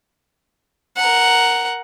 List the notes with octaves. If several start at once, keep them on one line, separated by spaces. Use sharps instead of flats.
A#4 F#5